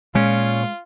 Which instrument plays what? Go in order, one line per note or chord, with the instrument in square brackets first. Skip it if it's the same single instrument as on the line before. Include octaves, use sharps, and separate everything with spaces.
[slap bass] A#2 [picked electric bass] G#3 [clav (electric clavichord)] C#4 [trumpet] F4